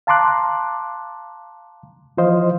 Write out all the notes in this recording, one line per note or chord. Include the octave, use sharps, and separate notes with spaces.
F5 A5 A#5 C6 D6 F#6
E3 F3 F4 C5 D#5 F5